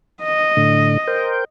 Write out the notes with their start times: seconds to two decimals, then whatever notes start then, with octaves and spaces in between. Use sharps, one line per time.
0.23 D#5
0.57 A2 D3
1.07 A#4 C5 G5